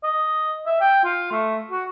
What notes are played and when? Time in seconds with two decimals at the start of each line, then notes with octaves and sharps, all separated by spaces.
0.04 D#5
0.66 E5
0.81 G5
1.04 F4
1.32 A3
1.71 F#4